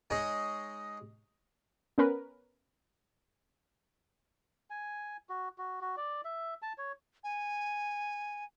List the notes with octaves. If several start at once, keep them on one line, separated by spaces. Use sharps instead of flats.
G#3 D#4 G#4 C#5
B3 C#4 A#4 B4
G#5
F#4
F#4
F#4
D5
E5
A5
C#5
G#5